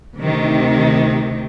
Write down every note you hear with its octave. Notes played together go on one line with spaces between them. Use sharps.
D2 C3 D#3